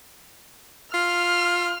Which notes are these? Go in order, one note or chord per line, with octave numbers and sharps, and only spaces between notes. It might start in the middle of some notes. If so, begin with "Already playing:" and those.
F4 F6